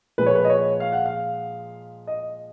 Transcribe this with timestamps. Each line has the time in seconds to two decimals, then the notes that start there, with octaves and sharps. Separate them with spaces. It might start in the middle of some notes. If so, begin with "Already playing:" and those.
0.18 A#2 F3 G#3 B4
0.26 C#5
0.35 B4
0.45 D#5
0.50 C#5
0.80 F5
0.93 F#5
1.06 F5
2.07 D#5